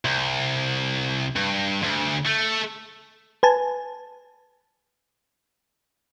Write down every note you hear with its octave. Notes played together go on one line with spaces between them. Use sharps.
C2
G2
D2
A3
B4 G#5 A5